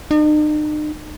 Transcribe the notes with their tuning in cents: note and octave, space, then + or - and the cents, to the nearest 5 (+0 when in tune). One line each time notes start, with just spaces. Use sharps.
D#4 -45